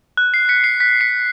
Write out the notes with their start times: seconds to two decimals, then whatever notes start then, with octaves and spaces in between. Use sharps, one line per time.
0.17 F#6
0.34 C7
0.49 B6 C#7
0.64 C7
0.80 B6
1.01 B6 C#7